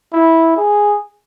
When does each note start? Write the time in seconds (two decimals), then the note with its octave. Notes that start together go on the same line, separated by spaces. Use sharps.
0.13 E4
0.57 G#4